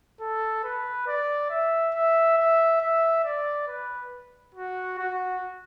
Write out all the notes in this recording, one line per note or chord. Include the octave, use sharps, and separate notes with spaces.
A4
B4
D5
E5
E5
E5
E5
D5
B4
F#4
F#4